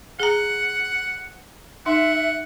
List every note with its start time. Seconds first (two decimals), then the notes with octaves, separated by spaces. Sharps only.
0.20 G#4 F#5 A#5
1.86 D#4 E5 F#5